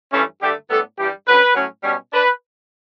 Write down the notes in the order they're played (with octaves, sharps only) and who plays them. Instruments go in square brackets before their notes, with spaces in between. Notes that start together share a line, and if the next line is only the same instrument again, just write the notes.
[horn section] G2 E3 A3 C#4
G2 D3 A3 G4
A2 G3 B3 D4 A4
G2 E3 G3 G4
D3 F#3 C#4 B4
A2 F#3 C#4
B2 G3 C#4
D4 B4